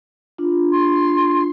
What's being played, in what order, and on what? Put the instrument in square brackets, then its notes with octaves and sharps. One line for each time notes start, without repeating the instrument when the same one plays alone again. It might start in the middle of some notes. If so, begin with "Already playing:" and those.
[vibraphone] D4 F4
[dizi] C6